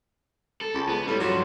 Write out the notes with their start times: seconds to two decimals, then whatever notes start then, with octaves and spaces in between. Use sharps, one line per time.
0.61 A4
0.75 C#2
0.89 B3
1.07 A2 G3
1.20 G2 F3 F#3